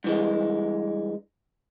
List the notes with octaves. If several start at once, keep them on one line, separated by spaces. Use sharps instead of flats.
G2 E3 G#3